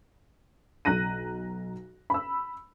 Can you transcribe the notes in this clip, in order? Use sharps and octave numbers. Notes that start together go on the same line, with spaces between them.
B1 A#5 F#6 A#6 D#7
B5 E6